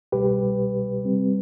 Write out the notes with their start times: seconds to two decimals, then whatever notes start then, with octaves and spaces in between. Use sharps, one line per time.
0.12 C2 B2 G3 G4 B4
1.03 C3 G3 C4